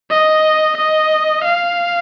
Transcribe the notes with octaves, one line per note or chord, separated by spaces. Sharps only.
D#5
D#5
F5